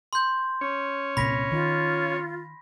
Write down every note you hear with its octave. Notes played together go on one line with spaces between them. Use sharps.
C6 G6
C#4 C#5
C2 A#2 B5 A#6 B6
D#3 F4